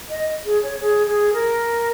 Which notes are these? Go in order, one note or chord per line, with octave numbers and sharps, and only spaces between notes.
D#5
G#4
C#5
G#4
G#4
A#4